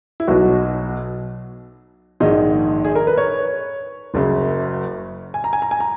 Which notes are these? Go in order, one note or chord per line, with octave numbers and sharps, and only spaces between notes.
E4
B1 B2 F#3 F#4
A#1 G#2 D#3 G#3 D#5
G#4
A#4
B4
C#5
F#1 F#2 C#3
G#5
A#5
G#5
A#5
G#5
A#5